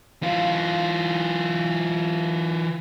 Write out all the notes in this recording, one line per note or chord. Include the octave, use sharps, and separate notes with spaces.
E3 F4